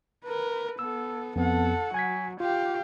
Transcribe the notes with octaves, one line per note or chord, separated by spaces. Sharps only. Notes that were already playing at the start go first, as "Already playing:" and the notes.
A#4 B4
B3 A4 E6
F2 B3 A4 F#5
F#3 G#5 G#6 B6
F4 G4 F5